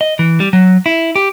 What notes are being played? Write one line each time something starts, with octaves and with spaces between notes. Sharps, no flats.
D#5
E3
G3
F#3
E4
G4